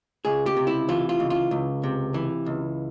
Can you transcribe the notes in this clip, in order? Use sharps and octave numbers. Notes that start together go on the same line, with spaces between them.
C#2 G#4
G4
C3
E4
E3 F4
F4
C#2
F4
C#2
C3
E3
C#2